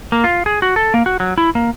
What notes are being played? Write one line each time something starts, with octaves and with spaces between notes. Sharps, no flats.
A#3
F4
G#4
F#4
A4
A#3
F#4
F#3
E4
A#3